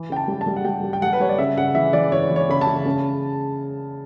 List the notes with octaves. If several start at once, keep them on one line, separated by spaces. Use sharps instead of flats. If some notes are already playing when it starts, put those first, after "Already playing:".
Already playing: E3
C#3 G5
A5
G3
A5
G3
F#5
G3 G5
G3
G5
G3 F#5
B4
G3 C#5
D5
C#3 E5
C#3 F#5
E3 E5
E3 D5
E3 C#5
E3
C#5
C#3 B5
A5
C#3
C#3